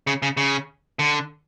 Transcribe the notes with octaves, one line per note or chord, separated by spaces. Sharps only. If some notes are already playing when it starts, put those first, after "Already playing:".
C#3
C#3
C#3
D3